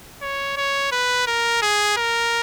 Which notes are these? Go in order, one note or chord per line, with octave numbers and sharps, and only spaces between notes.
C#5
C#5
B4
A#4
G#4
A#4